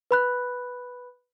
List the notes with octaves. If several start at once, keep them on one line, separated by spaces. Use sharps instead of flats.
B4 B5 F#6